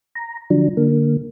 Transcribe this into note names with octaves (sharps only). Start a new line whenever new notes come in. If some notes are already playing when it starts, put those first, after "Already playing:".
A#5
D3 F3 F#3 D4
D3 A#3